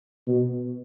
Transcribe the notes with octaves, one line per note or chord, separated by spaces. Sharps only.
B2